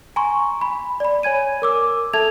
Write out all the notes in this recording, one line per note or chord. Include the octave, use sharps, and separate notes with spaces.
G#5 A#5 C6 C#6
B5
D5 B5
C#5 G#5 G#6 D#7
A#4 D6 E6
A4 E5 A5 G#6 F7